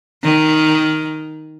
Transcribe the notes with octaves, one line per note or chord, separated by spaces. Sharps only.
D#3